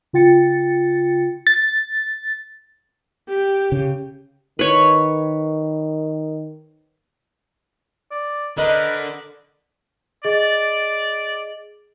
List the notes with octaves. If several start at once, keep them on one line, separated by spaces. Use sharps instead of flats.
C#3 F4 G5 A6 C#7
A6
G4
C#3
D#3 B4 C#5
D5
D3 A#4 B4 D5 D#5 B5
G#4 D5 D#5 A6